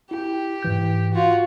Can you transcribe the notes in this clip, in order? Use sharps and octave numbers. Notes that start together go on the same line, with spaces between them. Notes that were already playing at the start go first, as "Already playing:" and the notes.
E4 G4
G#2 E3 G6
F4 F#4